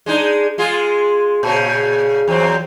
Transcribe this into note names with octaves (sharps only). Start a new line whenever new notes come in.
G#3 D4 D#4
G#3 F4 G#4
A#2 C#3
E2 F#3 C4